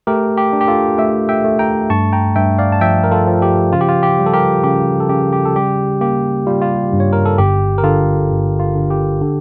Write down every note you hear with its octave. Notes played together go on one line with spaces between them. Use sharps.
A3 G4 A#4
G4
D4
G4
F4 A4
A3 E5 G5
E5 G5
A3
G5 A#5
G2 A5 C#6
G5 A#5
G2 E5 G5
D5 F5
A5
F3 E5 G5
A#4
F4 A4
F3
G4
C#3 F4
G4
F4
G4
G3
A4
G4 A#4
C#3 G4
A4
C#3 G4
G4
A4
G3 G4
A#3 G4
G3 F4
F4
G2
C#5
A#4
A4
G1 G4
A#4
D3 F4 A4
G1
F4
D3
G4
D3